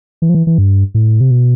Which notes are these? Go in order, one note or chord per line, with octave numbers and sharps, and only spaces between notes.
E3
F3
E3
E3
G2
A2
C3
B2